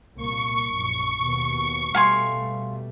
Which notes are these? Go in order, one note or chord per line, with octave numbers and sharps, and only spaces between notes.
C2 A#2 A#3 C#6
A#1 F#2
D#2 B2
B2 G3 A3 F5 G#5 C6